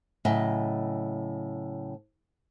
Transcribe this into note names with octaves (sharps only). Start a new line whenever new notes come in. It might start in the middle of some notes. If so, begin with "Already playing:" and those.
A2 C#3 F#3 D#5 E5 G#5